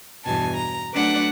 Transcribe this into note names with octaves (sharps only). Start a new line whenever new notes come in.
E2 G2 B2 G#5 A5
A#5
F#3 A3 D4 B4 F#5 D6